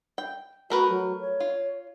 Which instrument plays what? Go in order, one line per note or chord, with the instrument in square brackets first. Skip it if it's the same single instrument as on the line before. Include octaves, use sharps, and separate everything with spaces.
[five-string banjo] G5
[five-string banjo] A3 A#4 B4 [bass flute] F#4
[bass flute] F#3
C#5
[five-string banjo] F4